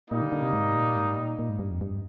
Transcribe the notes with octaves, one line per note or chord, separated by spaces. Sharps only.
A#2 G3 A#3 D#4
D3
D3
C3
G#2
A#2
G#2
A#2
A#2
G#2
G2
F2
G2